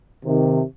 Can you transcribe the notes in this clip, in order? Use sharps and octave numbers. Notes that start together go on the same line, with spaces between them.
C3 D#3